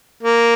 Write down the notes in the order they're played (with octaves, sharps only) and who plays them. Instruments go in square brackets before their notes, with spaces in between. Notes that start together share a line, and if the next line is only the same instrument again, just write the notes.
[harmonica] A#3